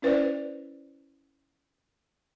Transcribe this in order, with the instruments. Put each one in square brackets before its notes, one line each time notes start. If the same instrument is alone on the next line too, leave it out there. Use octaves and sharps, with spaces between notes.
[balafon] C#4 E4 B4 C5 D5 E5